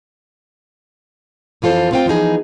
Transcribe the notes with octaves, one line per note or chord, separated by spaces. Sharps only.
F2 E3 F4 A4 C5
A3 B3 C4 F4 C5 G5
E3 F3 B3 D#4 G#4